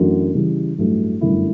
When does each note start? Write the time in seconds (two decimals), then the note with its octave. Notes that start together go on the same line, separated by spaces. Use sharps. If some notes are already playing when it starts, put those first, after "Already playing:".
Already playing: F#2 E3 A3 D4 F#4
0.35 C#3 E3 G3
0.78 A1 G2 F#3 A3
1.21 G1 F#2 D3 A3 E4